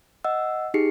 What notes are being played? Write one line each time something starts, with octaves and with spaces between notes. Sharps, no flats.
D#5 F#5 E6
D#4 G4 G#4 C7 C#7